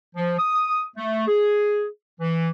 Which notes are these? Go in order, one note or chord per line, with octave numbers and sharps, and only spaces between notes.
F3
D#6
A3
G#4
E3